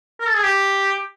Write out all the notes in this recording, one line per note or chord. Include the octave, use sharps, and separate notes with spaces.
A#4
A4
G#4
G4